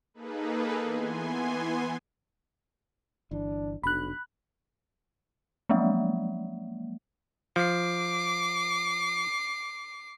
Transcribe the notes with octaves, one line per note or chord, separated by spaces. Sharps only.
A#3 D#4 G#4 A4 B4
E3 B3 G#5 C6
G1 E3 D4
F1 B1 D4 B5 F#6
F3 F#3 G#3 A#3
F3 D6 C7